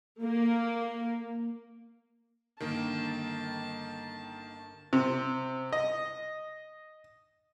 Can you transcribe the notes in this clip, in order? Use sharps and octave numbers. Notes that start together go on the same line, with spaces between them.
A#3
G1 D#3 A#3 A5
C3
D#5